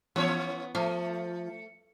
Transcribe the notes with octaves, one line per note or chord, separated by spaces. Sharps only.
E3 B3 C#4 C#5
F3 A3